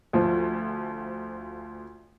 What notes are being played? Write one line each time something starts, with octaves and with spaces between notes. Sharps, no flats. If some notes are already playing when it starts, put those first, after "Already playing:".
D2 F3